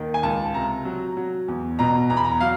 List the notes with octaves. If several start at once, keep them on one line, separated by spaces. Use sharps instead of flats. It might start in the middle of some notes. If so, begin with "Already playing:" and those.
Already playing: D#2 D#3
G#5
C#2 A5
C3 A#5
F#3
F#3
E2
B2 A#5
E2 A#5
B5
A#5
F#3 F5